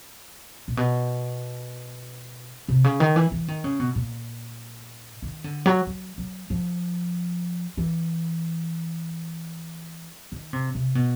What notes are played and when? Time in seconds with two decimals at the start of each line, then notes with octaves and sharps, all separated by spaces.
0.68 A#2
0.77 B2
2.68 C3
2.84 C#3
3.00 D#3
3.16 E3
3.32 E3
3.48 D#3
3.64 C#3
3.80 B2
3.95 A#2
5.22 D#3
5.44 D3
5.66 F#3
5.87 F#3
6.18 F#3
6.50 F3
7.77 E3
10.32 D#3
10.53 C3
10.75 C3
10.95 B2